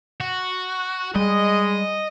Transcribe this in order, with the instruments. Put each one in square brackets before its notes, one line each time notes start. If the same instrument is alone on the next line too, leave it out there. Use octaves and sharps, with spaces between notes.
[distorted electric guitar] F#4
[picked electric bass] G3 [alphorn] G#3 [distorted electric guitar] D#5